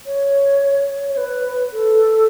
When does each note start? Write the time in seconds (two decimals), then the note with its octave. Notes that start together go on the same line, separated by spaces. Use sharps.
0.06 C#5
1.09 C#5
1.17 B4
1.73 A4